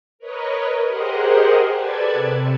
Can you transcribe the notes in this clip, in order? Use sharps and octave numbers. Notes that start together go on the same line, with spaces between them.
A#4 B4 C#5 D#5
G4 G#4 A#4 C5 D#5 F#5
A4 B4 D5 A5 G#6
C3